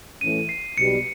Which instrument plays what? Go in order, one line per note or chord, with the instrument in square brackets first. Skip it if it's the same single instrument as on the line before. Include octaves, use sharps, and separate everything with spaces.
[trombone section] A2 E3 A3 C#4 [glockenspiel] D#7
[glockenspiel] C7
[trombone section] B1 B2 G3 [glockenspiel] C#7